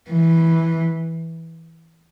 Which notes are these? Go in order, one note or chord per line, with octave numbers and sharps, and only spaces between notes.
E3